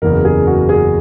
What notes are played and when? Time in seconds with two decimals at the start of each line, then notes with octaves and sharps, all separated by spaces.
0.02 F#1 E2 C#3 A#4
0.25 G#4
0.47 F#4
0.69 G#4